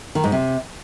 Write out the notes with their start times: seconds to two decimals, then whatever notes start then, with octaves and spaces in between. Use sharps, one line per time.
0.15 D#3
0.24 G#2
0.32 C3